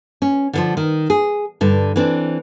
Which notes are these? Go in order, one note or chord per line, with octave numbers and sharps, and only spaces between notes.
C#4
D3 E3 F3
D#3
G#4
G2 D3
E3 C4 D4